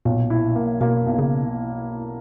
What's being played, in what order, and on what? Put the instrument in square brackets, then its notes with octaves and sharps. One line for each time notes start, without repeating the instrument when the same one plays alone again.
[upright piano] B1 [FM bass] A#2
[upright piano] E4
A#3
[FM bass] B2 [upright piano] A#3
[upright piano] B1
[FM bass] C#3